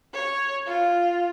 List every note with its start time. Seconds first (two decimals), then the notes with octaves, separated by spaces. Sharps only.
0.13 C#5
0.67 F4